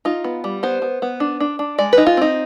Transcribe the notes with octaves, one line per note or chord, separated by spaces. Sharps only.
D#4 F4
B3
G3
B3 C5
B3
B3
D4
D4
D4
G#3 D5
D#4 B4
F4
C4 D#4